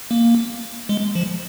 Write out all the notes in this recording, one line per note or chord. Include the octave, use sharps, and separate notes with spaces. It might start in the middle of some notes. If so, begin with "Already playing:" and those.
A#3
G#3
F3